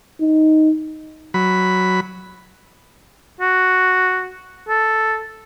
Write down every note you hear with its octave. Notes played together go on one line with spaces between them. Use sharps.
D#4
F#3 B5
F#4
A4